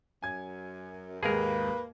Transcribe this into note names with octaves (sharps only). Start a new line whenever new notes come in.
F#2 G#5 G#6
D#2 G#2 A#3 G#4 A#4 B4